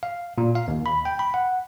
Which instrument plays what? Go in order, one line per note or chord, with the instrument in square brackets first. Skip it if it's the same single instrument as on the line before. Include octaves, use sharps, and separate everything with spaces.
[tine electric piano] F5
A#2
F5
D#2
B5
G5
B5
F#5